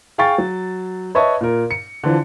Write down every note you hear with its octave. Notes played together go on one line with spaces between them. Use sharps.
G#4 F5 G5 C#6 A6
F#3
B4 C#5 D#5 E5 A5 C#6
A#2 A#4
C#7
D3 E3 F3